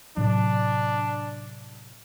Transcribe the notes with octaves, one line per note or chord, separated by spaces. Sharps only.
A2 C3 F#3 D4